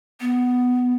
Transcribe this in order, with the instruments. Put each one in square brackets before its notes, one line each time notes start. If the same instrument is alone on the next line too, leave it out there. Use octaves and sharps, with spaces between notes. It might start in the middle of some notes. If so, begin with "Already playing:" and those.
[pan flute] B3